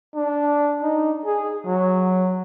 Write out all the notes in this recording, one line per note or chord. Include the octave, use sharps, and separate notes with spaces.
D4
D#4
G#4
F#3